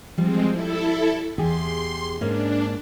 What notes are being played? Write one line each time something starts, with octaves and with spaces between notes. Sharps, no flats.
F3 G3 G#3 C4
E4 A4
E2 G4 G#4 C6
G#2 A#3 C#4 D4